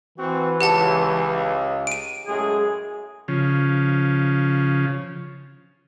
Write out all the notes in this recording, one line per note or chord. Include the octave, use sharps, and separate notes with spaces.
E3 C4 F#4
C#2 G4 F#5 A5
D7 D#7
F#2 A2 G#3 G#4
C#3 F3